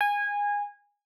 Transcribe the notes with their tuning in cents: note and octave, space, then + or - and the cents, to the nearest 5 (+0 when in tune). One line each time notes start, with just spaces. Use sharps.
G#5 -20